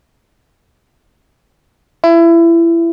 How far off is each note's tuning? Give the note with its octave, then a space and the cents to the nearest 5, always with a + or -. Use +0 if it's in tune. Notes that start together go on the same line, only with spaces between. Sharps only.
E4 +25